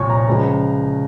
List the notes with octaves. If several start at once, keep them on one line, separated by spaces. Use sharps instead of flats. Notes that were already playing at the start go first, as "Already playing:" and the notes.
Already playing: C2 A#2 F3 C#5 C#6
A#5
C#2 C#3 F3